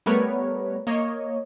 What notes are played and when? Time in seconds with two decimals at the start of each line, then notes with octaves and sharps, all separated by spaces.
0.06 G3 A3 B3 A#4 B4 C#5
0.87 A#3 C#5 D#5